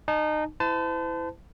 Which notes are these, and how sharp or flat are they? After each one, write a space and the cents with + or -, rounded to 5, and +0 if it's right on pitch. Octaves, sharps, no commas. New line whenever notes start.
D#4 -25 A5 -40
E4 +0 C5 -45 A5 +0